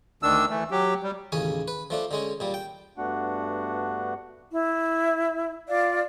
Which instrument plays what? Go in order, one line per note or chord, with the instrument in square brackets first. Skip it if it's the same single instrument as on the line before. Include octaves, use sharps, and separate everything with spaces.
[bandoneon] D2 D#3 D4 E6
E3 A3
F#3 G4
G3
[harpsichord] A1 D#2 C#3 C#5 G#5
B4
F3 A3 D4
D3 G#3 C#4
A#2 G3
G5
[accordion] G2 A3 B3 D4 F#4 F#5
[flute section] E4
F4 D5 F5